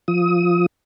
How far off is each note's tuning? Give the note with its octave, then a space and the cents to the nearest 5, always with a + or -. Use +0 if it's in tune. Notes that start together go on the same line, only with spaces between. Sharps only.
F3 +0 D#6 +25